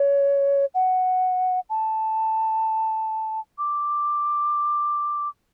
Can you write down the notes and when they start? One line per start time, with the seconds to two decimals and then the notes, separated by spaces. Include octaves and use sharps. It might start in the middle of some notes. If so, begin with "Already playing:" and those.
Already playing: C#5
0.74 F#5
1.70 A5
3.58 D6